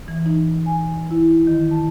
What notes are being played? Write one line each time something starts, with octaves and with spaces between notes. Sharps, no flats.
E3
D#4
G#5
E4
D#3
A5